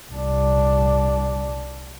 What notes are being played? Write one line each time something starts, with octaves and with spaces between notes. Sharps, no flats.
C2 D4